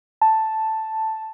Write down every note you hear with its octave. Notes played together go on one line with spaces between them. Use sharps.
A5